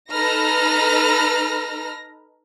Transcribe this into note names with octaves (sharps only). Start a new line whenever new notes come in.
D#4 A4 B4 A#5 F6 A#6